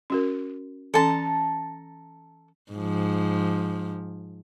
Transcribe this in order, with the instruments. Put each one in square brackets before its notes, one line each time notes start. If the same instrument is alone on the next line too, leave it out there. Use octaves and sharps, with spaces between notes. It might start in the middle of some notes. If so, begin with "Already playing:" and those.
[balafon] C#4 F#4 A#4
[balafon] E3 C#4 [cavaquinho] A4 A5 A#5
[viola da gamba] G#2 F3